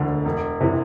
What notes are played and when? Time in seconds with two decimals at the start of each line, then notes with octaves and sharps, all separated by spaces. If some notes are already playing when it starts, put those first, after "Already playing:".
Already playing: E1 D2 D3
0.25 E1
0.61 C3 E3